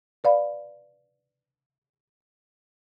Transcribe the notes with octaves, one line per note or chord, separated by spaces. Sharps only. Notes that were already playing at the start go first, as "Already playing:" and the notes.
B4 D5 F5 B5